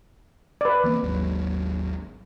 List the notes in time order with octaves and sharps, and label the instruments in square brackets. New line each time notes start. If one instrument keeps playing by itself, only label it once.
[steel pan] B4 D5
[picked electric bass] E3 A#3 C4
G#1 D#2 F#3